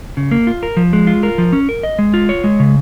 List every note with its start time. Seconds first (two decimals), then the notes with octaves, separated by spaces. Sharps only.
0.17 C#3
0.31 A#3
0.47 F4
0.63 A#4
0.77 F3
0.93 G#3
1.07 F4
1.23 A#4
1.38 F3
1.53 C#4
1.69 A#4
1.83 D#5
1.99 G#3
2.14 F4
2.29 C#5
2.44 G#3
2.60 C#3